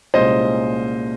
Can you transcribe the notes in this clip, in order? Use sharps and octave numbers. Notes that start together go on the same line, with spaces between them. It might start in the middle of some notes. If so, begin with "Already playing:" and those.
C2 A#2 G#3 C#4 C5 D#5